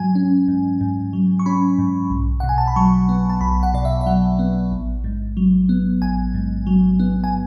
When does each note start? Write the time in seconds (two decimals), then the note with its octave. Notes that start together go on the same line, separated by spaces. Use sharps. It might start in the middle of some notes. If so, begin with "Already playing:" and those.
Already playing: G#2 F#3 G#5
0.15 C#4
0.48 G#2
0.81 G#2
1.13 F#3
1.39 C#6
1.46 C#4 B5
1.79 G#2
2.10 B1
2.40 B2 F#5
2.49 G#5
2.58 A5
2.68 B5
2.76 F#3 C#6
3.09 B3
3.30 A5
3.41 B1 B5
3.63 F#5
3.74 B2 D5
3.85 E5
4.01 E5
4.06 F#3 F#5
4.39 B3
4.72 A1
5.04 G#2
5.37 F#3
5.69 B3
6.02 A1 G#5
6.34 G#2
6.67 F#3
7.00 B3
7.24 G#5